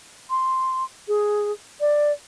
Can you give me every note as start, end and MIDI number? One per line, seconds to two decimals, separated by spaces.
0.30 0.84 84
1.08 1.52 68
1.80 2.12 74